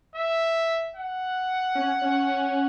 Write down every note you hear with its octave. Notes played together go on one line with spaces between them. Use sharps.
E5
F#5
C#4
C#4